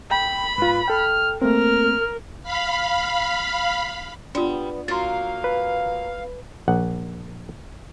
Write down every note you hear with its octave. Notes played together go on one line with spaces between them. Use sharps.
G5 B5
G#2 F4 B4
A4 G5 F6
A3 A#3 C4 A#4 F6
F5 B5
G3 B3 D4 F4
F#3 A#3 F4 F5 C6 A6
B4
A#1 F#5